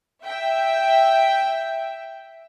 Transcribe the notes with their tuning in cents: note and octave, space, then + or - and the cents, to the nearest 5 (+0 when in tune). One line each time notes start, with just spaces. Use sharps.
E5 +0 G5 +0